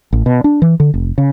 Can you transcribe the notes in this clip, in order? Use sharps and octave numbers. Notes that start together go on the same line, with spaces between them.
A1
B2
D4
E3
D3
F1
C#3